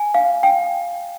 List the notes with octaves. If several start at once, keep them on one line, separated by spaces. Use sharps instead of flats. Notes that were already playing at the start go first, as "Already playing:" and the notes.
Already playing: G#5
F5
G5